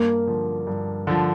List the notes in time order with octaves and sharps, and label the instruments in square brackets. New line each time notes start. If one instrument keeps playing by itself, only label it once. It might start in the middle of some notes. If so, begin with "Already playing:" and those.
Already playing: [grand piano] G2 [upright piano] A#3
[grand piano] D3 F3
G2
D3 F3